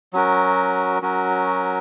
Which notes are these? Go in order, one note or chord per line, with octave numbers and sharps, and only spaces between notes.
F#3 C#4 F#4 A#4
F#3 C#4 F#4 A#4